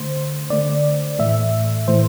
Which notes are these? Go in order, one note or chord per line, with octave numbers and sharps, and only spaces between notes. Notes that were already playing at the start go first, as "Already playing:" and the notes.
Already playing: D3 A3 C5
D3 A3 D5
A2 E3 A3 E5
A2 E3 A3 C5